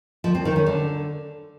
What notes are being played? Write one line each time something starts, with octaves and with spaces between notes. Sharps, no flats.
F3
C4
D#3
C#4
D3